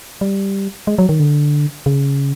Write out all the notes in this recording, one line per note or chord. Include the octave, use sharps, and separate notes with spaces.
G3
G#3
F#3
D#3
D3
C#3